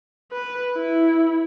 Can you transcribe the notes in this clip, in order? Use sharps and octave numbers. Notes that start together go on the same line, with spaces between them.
B4
E4